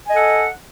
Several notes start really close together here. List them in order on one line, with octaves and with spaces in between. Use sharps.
G#5 D#5 A4 F#5